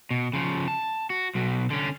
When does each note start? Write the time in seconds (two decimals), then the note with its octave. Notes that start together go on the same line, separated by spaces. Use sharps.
0.11 B2
0.33 C#3 F3
0.68 A5
1.10 F#4
1.35 B1 B2
1.71 D3 C#4